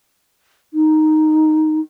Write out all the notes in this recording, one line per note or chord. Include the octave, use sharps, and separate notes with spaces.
D#4